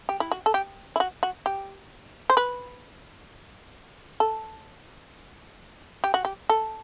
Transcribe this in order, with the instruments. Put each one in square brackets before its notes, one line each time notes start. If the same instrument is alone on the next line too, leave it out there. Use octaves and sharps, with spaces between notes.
[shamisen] G4
E4
F#4
A4
G4
E4
F#4
F#4
G4
C5
B4
A4
G4
F#4
G4
A4